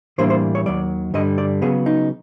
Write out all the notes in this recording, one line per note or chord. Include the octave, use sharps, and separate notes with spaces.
A2 E3 G3 A#3 D4 C5
C5
C#5
D#2 D#3 F#3 D5
G2 D3 G3 D#5
D5
C#3 F#3 B3 G#4
D#4